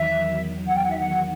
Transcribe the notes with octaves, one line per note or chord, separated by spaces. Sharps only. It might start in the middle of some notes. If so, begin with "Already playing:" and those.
Already playing: E2 D#3 F#3 E5
F#5
G5
F#5
E5
F#5